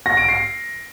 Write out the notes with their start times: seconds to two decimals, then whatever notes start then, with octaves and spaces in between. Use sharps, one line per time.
0.06 A#6
0.17 D7
0.29 C7